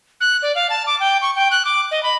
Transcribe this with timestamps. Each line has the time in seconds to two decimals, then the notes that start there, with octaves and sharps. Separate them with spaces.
0.21 F#6
0.42 D5
0.55 F5
0.70 A5
0.87 D6
1.00 G5
1.22 C#6
1.36 G5
1.51 F#6
1.65 D6
1.91 D#5
2.03 B5